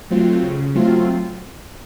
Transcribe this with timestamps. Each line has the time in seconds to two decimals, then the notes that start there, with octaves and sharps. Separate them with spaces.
0.10 F#3 A3 C4 F4
0.43 C#3
0.75 F#3 A3 C4 F4